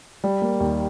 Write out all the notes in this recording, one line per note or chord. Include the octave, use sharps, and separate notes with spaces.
G3
A#3
D#2